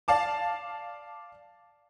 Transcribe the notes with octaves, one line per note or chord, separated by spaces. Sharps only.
D5 F5 A5 D6